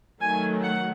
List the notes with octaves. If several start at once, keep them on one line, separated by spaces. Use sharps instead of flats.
D#3 F#3 A3 G#5
F#5